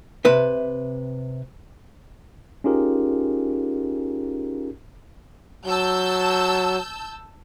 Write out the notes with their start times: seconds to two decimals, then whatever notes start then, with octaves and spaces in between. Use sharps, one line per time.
0.25 C3 B4 E5
2.64 C#4 D#4 F4 G4 G#4 A#4
5.66 F#3 A5 E6 G6